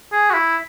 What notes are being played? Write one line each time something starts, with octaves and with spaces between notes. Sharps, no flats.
G#4
F#4
E4